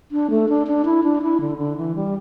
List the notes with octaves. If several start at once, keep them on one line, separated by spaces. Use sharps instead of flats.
D4
A3
D4
D4
E4
D4
E4
D3
D3
E3
G3